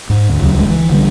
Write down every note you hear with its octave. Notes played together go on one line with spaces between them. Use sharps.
G#2
D2
D2 C#3 F#3
D1 E3 G#3
E3
B1 D3 F#3 G3